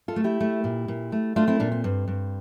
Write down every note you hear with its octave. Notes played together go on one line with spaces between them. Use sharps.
F4 A4
A3
E4 G4
A3
A#2
A#2
A3
A3 D4 F4
C4 E4
A#2 D4
C4
G2
G2